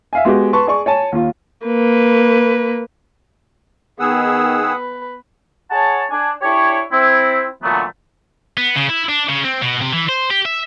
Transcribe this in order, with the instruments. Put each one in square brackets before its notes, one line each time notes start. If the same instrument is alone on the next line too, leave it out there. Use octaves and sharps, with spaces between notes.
[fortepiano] E5 F5 G#5
G#3 B3 F#4 G4
B4 A5 C6 C#6
G#4 D5 C#6
C#5 G#5 A5
D#2 F4
[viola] A#3 B4
[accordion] D#3 G#4 E6 [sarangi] B3 [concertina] F#5 D#6
[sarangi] B4
[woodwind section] G#4 C#5 F#5 A5
D4 G#5
D4 E4 G4 C#5
C4 E4
A#2 D3 E3 F#3 A3 B3
[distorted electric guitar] B3
C#3
E4
D4
C#3
C4
B2
C3
E3
C5
G4
E5